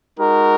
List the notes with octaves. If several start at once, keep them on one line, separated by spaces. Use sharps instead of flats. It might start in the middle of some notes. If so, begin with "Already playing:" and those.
G#3 D#4 F#4 A#4